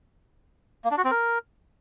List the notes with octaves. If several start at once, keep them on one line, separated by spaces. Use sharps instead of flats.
A#3
D4
F#4
C4
A#4